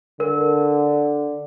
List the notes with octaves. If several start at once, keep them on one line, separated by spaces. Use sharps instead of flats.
D3 A#4